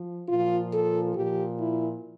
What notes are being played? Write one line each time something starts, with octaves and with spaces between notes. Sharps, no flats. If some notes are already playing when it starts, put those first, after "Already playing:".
Already playing: F3
A#2 F3 F4
A4
A#2 F3 G4
E4